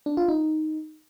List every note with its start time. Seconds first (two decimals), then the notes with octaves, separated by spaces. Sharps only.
0.06 D4
0.17 F4
0.28 D#4